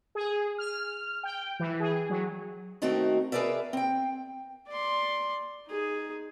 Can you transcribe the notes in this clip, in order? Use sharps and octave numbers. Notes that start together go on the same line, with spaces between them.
G#4
F6
G5
E3
G#4
F#3
D#3 A3 C4 D#4 F#4 A#4
G#4 A#4 B4 D5 E5
C4 G5
D5 C6
D#4 G#4